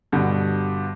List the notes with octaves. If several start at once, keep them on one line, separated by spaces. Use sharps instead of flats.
G2 B2 D3 G3